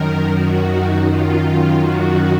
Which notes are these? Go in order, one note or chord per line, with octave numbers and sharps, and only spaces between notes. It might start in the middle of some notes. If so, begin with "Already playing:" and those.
Already playing: F#2 D#3 A#4
F#4
F4
F4
F#4